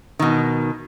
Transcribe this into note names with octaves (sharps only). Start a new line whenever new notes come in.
B2 D#3